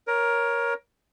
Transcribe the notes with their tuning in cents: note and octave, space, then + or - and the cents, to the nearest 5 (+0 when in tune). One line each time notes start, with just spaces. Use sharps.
A#4 +15 C#5 +0